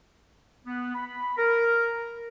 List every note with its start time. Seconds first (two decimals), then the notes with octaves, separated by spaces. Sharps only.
0.66 B3
0.95 B5
1.38 A#4